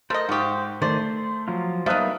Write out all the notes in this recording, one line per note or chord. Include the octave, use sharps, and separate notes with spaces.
A3 A#4 C5 D#5
G#2 F3 G4 C#6 D#6
D#3 A3 C5 D5
C6
F3 F#3 F4
F3 G3 A#3 B3 D#4 E5 D#6 F#6